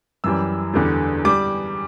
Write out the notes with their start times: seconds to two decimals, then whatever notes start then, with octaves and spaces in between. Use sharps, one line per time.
0.24 F#2 E3 G3 E6
0.74 E2 D3 G3
1.25 G3 D6